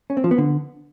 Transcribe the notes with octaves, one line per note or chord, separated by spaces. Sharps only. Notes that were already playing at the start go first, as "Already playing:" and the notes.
C#4
C4
F3
B3
D3